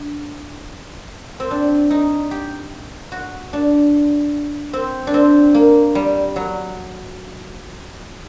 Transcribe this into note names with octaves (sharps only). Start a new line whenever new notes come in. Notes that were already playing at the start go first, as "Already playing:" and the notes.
Already playing: D4
C4
D4
D#4
G4
F#4
D4
C4
D4
C4
A#3
G3
F#3